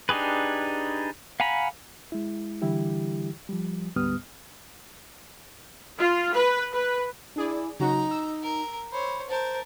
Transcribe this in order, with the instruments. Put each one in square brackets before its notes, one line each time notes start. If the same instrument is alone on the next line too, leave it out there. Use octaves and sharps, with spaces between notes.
[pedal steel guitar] D4 D#4 G4 G#4 B4
F5 F#5 G#5 A#5 B5
[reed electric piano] G#3 E4
D3 E3 G3 E4 G4
F3 G3
D2 G#2 G3 B3 D#6 F6
[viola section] F4
B4
B4
[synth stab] D4 G#4 D5 [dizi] E4
[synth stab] C#3 F#3 F#4 [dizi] D#4 [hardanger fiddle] A#5
[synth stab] E6
[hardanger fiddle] A#4
[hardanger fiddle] C5 C#5 [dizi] B5
[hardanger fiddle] A#4 A5 [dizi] C5